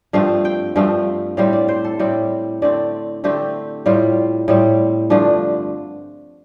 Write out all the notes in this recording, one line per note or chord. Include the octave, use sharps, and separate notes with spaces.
G2 F3 A3 C4 F5
G5
G2 F3 A3 C4 G5
A2 G3 C4 F5
D5
C5
A4
A2 G3 C4 D5
D3 A3 C4 D5
D3 A3 C4 G4
A2 G3 C4 F4
A2 G3 C4
G2 D3 F3 A3 D4